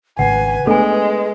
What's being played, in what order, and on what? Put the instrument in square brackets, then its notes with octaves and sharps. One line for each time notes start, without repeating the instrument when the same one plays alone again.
[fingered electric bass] G#1 C#3 [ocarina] B4 [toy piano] F#5 [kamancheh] G#5
[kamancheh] G#3 [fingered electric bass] A3 B3 D4 [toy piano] A4 G#5